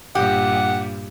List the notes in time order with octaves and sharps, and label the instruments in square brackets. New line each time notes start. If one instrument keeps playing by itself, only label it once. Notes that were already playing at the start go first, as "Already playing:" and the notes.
[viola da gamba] G2 A#2 [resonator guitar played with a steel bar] G4 [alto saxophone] F#5